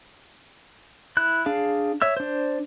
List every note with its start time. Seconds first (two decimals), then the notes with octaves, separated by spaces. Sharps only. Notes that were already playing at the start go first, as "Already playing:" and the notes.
1.17 E4 F#6
1.46 D4 G#4 F5
2.02 C#5 E5 E6
2.17 D4 C5